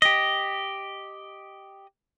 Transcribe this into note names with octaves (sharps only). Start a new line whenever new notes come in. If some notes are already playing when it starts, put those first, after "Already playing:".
G4 D#5